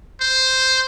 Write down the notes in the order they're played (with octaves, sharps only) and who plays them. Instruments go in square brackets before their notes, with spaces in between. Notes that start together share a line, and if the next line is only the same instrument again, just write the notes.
[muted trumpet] C5